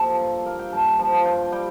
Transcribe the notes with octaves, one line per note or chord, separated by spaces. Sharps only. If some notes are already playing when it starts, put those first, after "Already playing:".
Already playing: F3 A#3 G4 A4
G2
A#3 A#4
G5
G2 A5
G5
F3 A5
G5
G2 G5
G3 G5